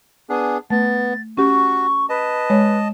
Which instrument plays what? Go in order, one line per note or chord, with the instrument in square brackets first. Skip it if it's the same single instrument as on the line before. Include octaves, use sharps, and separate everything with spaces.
[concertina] B3 D4 G#4 [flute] G#5
[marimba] A3 [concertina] B3 [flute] A6
[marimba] C#4 G4 [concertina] F#4 [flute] C#6
[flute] B4 [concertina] D#5 A5
[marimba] G#3 C#5